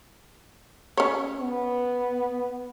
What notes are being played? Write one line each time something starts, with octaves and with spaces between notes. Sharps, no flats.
C#4 C#5
B3